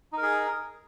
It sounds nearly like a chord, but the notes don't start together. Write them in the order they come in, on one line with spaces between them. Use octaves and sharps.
D#4 A#4 G#4